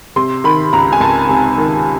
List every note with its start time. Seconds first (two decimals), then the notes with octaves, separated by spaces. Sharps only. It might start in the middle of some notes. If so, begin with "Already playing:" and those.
0.16 C3 C6
0.44 D#3 B5
0.73 C#2 A#5
0.93 G#5
1.01 C#2 A5
1.29 C3
1.58 D#3